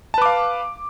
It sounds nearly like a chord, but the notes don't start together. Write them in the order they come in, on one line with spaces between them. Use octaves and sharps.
A5 B4 D6 F5